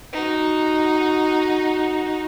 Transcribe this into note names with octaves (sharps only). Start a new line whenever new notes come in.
D#4 F#4